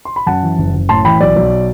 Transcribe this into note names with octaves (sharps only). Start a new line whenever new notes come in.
C6
B5
F#2 F#5 A5
E3
F#1
F#1
A2 A5 C6
E3 G5 B5
B1 D5
B1